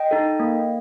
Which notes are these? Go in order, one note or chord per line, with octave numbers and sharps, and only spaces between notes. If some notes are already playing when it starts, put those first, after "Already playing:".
Already playing: D#5 G5
D#4 A4
A#3